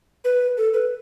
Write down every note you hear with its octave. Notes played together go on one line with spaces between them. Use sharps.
B4
A4
B4